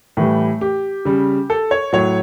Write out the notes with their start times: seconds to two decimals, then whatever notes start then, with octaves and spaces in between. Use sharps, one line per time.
0.17 A2 E3 G3 A3
0.61 G4
1.05 C#3 G3
1.50 A4
1.71 C#5
1.93 A2 F#3 C#5